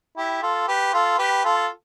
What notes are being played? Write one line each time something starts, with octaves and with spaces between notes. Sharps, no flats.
E4 G4
F4 A4
G4 B4
F4 A4
G4 B4
F4 A4